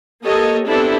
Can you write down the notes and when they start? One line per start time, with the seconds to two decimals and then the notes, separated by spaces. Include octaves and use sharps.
0.24 A#3 G4 A4 C#5 D#5
0.67 B3 C4 D4 E4 G4 A4